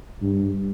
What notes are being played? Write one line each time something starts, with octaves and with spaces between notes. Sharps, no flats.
G2